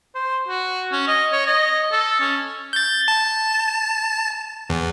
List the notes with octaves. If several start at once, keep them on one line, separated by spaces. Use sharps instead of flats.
C5
F#4
C#4
D#5
C#5
D#5
A4
C#4
G6 A6
A5
E2